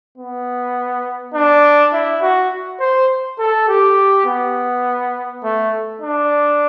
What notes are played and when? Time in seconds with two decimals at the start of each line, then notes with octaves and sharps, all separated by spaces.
0.18 B3
1.34 D4
1.93 E4
2.22 F#4
2.80 C5
3.39 A4
3.68 G4
4.26 B3
5.44 A3
6.02 D4